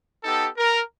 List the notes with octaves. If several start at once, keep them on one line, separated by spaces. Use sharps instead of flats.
B3 D#4 G4 A4
A#4